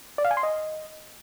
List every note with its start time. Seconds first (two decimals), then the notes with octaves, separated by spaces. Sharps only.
0.18 D5
0.24 F5
0.31 G#5
0.37 C6
0.43 D#5